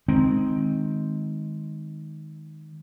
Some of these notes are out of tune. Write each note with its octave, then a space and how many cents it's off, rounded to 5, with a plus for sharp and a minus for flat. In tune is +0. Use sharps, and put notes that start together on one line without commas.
D#3 +0 G#3 +10 C4 +0